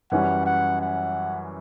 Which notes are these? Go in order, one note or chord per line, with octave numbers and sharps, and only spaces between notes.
F#2 E3 G3 C#4 F#4 F#5
F#5
F#5